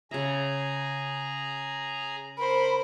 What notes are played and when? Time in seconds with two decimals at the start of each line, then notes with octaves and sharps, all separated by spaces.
0.11 C#3 G#4 E5 A#5
2.37 A#4 C5 B5